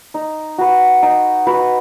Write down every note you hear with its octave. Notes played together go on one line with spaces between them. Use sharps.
D#4
F#4 B4
D#4
F#4 B4